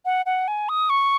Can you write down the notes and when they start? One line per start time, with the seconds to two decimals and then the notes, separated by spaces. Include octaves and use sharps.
0.05 F#5
0.26 F#5
0.48 G#5
0.69 D#6
0.90 C#6